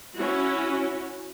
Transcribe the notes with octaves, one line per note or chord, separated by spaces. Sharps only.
C#4 E4 F#4